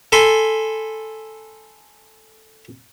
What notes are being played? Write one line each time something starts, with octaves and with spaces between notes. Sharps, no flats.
A4 G#5 B5 C6